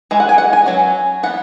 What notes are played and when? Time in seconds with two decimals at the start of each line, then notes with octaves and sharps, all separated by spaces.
0.11 E3 G#3
0.20 F#5
0.29 G#5
0.38 F#5
0.53 G#5
0.66 F#3 C#4
1.23 E3 F#5
1.26 B3